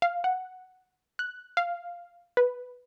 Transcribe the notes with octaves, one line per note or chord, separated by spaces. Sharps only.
F5
F#5
F#6
F5
B4